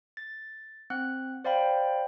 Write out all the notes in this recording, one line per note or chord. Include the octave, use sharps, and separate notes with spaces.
A6
C4 F#5 F#6
C5 D5 F5 G5 B5